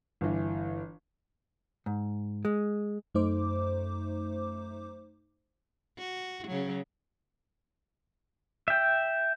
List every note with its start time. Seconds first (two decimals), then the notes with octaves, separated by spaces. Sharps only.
0.21 G1 E3
1.86 G#2
2.45 G#3
3.15 F#2 A3 D#4 C5 D6
5.98 F#4
6.48 C#3 F#3
8.68 E5 G5